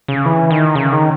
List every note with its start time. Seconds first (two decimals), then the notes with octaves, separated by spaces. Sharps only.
0.08 C#3
0.25 E3
0.51 D#3
0.75 C#3
0.92 D#3